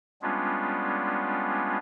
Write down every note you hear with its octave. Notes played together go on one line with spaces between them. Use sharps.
G3 G#3 B3 C#4 D4 F4